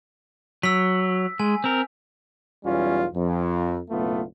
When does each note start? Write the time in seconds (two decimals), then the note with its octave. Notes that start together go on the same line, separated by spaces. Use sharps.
0.63 F#3 E6 B6
1.39 G#3 G#5
1.64 C4 A#4
2.65 B1 E2 G3 C#4 F4
3.13 F2
3.90 F#1 B1 A3 B3 F4